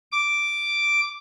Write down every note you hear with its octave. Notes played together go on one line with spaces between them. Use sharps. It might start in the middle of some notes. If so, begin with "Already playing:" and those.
D6